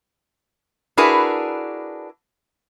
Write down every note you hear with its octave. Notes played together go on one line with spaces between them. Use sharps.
D4 E4 F#4 G#4 A#4 B4